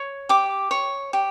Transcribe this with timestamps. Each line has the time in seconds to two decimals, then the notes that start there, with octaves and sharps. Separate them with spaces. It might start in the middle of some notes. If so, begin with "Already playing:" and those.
Already playing: C#5
0.29 G4 D6
0.71 C#5
1.13 G4